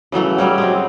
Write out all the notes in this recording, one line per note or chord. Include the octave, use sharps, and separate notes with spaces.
C#3 E3 F#3 A3
F#3 G3 C#4
G#3 C4